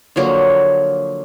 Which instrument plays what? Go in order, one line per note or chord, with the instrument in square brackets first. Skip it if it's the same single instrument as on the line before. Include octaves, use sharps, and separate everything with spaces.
[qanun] D3 F3 F#3 A#3